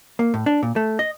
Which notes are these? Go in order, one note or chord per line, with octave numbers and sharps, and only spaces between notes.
A#3
A2
D4
A#2
A3
D#5